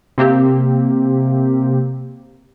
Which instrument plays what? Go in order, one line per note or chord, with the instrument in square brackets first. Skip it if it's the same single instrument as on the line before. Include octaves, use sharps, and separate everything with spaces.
[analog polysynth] C3 A#3 C4 G4